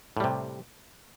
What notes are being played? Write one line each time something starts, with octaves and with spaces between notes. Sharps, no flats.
A2 C3 G3